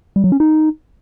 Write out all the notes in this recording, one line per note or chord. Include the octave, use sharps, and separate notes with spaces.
G3
F#3
C#4
D#4